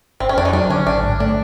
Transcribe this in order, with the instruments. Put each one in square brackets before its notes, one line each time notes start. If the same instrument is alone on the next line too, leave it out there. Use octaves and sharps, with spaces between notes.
[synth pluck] G1 [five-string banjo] C4
[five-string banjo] C#4
[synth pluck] F2 [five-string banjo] D4
[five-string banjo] D#4
[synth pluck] F#3 [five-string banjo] D4
[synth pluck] D3 [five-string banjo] C#4
[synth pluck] A1 [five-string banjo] D4
[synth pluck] G#2
[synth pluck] A3 [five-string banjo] D4